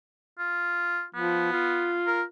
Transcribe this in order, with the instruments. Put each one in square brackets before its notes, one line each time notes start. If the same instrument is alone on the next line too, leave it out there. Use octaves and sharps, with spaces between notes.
[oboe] F4
[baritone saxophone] F3 [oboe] B3
[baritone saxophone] F4
[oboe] A#4